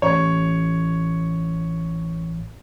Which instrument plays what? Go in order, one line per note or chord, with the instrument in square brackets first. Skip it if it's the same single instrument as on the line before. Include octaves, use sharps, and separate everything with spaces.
[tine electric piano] A1 [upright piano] C#5